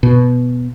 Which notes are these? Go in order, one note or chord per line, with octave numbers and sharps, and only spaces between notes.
B2